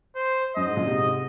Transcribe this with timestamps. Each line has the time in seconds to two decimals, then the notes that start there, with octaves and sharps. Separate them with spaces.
0.15 C5
0.56 F#2 D#5
0.67 G#2
0.76 F#2 A#2
0.87 G#2 C3